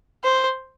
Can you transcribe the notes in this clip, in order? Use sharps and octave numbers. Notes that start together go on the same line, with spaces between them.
C5